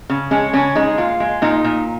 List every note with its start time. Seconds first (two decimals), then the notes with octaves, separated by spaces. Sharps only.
0.10 C#3
0.31 G#3 C#4
0.53 C#3 C#4
0.75 G#3 D#4
0.98 A#2 F4
1.20 G#3
1.42 A#2 D#4
1.64 A#2